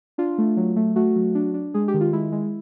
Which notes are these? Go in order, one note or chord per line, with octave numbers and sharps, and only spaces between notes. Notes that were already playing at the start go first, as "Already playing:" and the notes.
D4 F4
A3
F#3
A3
A3 F#4
F#3
D4
D4
G#3 G#4
G4
D#3
F4
G#3 E4
G#3